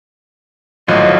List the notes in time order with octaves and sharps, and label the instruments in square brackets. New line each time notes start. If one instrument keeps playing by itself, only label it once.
[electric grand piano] G#1 A2 [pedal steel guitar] F3 F#3 F4 [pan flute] D#5